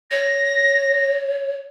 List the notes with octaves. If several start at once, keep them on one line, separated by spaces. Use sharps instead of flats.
C#5 A#6